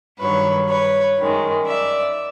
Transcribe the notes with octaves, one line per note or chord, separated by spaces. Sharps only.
G2 D#3 F#3 B4 C#5
B4 C#5
F#2 D#3 G#3
D5 E5